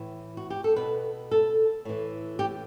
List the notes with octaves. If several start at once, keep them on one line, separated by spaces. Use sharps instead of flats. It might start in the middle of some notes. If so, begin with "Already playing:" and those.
Already playing: A2 E3
F#4
G4
A4
B2 B4
A4
A2 E3
G4